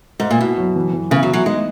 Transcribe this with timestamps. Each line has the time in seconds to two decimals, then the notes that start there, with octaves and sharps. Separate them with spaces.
0.20 G#2
0.31 A#2
0.41 B2 E4
0.58 F#3
0.76 E3
0.93 E3
1.11 C#3 B3
1.23 F#3
1.28 E4
1.33 F#3
1.46 G#3 D#4